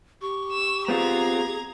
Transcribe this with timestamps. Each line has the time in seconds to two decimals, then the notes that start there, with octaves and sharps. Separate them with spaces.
0.21 G4 C#6
0.52 E6
0.88 B3 C4 F4 G#4 A#5 G#6